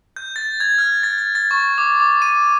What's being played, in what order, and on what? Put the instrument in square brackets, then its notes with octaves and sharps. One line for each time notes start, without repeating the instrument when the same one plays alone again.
[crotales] G6
A6
G#6
F6
A6
A6
A6
C#6
D6
D6
D#7